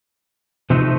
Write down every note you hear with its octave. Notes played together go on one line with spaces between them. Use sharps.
C3 F3 A3 C4 D#4